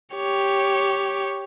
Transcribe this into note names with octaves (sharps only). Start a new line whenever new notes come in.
G4 C#5